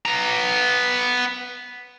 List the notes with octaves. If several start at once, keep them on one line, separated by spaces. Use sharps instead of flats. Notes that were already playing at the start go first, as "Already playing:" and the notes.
B3 A#5